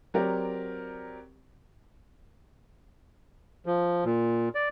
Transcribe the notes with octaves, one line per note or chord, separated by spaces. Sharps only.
F#3 C4 G4 A#4 D5
F3
A#2
D5